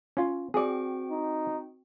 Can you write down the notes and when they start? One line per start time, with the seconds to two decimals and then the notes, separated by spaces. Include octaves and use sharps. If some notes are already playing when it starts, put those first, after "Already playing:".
0.17 C#4 F4
0.54 C4 F#4 G#4 D5 G5
1.10 D#4